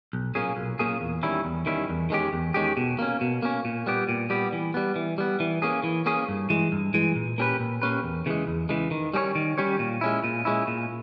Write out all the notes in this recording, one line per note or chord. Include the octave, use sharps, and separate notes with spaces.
B1
A#2 A#3 C#4 G#4
B1
A#2 A#3 C#4 G#4
E2
D#3 G3 C#4 E4
E2
D#3 G3 C#4 E4
E2
D#3 G#3 C#4 G4
E2
D#3 G#3 C#4 G4
B2
A#3 C#4
B2
A#3 C#4
A#2
G3 B3 G4
A#2
G3 B3 G4
E3
G3 B3
E3
G3 B3
E3
A#3 C#4 G#4
E3
A#3 C#4 G#4
G2
E3 G#3
G2
E3 G#3
A#2
A#3 C#4 G4 B4
A#2
A#3 C#4 G4 B4
E2
C#3 E3 G#3
E2
C#3 E3 G#3
D#3
G3 C#4 G4 C#5
D#3
G3 C#4 G4 C#5
A#2
G#3 C#4 E4
A#2
G#3 C#4 E4
A#2